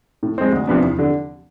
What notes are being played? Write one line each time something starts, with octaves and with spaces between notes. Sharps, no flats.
A2
G#3 C4
D2
C3 F3 B3 D4
E2
D3